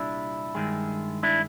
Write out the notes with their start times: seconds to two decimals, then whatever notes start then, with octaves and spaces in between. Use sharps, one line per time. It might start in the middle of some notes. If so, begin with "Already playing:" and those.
Already playing: C2 A#2 G3 D4 E4
0.55 G2 D#3 G#3
1.23 D4 E4